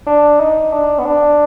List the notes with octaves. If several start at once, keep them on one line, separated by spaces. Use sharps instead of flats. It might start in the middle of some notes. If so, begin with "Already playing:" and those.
D4
D#4
D4
B3
D4